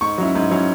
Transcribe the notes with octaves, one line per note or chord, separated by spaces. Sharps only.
G#2 C#6
F#3 C#4 E4
G#2
F#3 C#4 E4